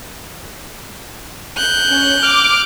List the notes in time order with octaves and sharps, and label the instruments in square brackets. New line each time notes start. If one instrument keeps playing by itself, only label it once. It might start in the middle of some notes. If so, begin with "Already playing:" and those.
[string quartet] F#6 G6
[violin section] C#4
[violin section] D6 [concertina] F6